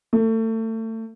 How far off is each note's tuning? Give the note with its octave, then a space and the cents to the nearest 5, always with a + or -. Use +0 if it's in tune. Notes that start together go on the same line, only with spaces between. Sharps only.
A3 +30